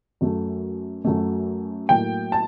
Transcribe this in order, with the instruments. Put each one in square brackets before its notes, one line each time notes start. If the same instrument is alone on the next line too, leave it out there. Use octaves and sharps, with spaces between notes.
[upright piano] F#2 F#3 A3
F#2 F#3 A3
A2 F#3 A#3 G5
A5